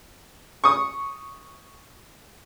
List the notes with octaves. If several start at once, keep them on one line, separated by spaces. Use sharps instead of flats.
C#6 D#6